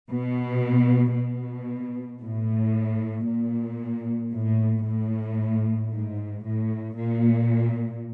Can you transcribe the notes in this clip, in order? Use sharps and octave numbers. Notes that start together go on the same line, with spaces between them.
B2
B2
A2
A#2
A2
A2
G#2
A2
A#2